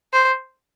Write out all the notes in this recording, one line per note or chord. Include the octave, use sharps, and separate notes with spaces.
C5